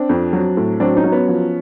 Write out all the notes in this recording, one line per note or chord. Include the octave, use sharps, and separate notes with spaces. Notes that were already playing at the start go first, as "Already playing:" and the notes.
Already playing: C4 D4
F2
F#3
A2
F#3 C4 D4
C#4 D#4
F#3
B3 C#4
F3